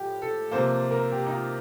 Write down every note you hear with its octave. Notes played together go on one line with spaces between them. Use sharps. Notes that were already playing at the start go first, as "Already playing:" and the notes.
Already playing: A2 F3 G4
A4
C3 F3 A#3 C5
A#4
G4
D#4
F4